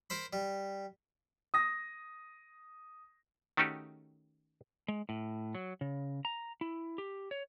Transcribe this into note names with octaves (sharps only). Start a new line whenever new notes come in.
A#4 C5 B5
G3
D#6 A#6
D#3 A3 C#4 D#4 F#4 G4
G#3
A2
F#3
C#3
A#5
E4
G4
C#5